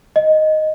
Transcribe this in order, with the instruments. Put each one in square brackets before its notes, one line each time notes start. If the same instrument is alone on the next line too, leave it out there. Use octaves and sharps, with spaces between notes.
[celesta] D#5